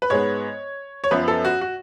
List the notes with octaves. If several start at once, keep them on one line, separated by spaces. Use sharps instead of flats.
B4
G#2 G#3 B3 C#5
C#5
F#2 F3 B3 B4
A4
F#4
F#4